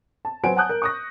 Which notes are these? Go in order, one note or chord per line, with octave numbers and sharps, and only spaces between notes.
A5
F#3 B4 C5 F#5 G#5 D7
F#5 G#5 A5 D#6 F#6 G6
A#4
C#6 D#6 A#6